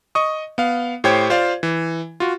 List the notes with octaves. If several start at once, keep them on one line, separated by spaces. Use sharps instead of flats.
D#5 C#6 D#6
B3 F5
A2 G4 C5 C#5 G5 G#6
F4 C5 D5 F5
E3
F4 F#4